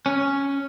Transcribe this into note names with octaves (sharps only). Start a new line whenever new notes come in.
C#4